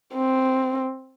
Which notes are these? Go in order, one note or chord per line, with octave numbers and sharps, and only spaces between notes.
C4